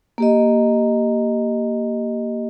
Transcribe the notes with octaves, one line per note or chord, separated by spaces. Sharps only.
A#3 G4 D#5